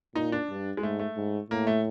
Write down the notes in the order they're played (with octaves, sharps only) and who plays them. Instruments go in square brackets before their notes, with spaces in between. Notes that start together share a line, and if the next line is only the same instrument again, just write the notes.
[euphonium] A#2 [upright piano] D#4
[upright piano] D4
[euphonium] G2
[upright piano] G#3
[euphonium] G#2 [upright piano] A3
[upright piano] A3
[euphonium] G#2
[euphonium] A2 [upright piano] A#3
[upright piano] A3